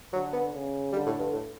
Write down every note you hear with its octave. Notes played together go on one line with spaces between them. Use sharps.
D3 F#3
B3
C#3
D3 G3
A2
G2
A2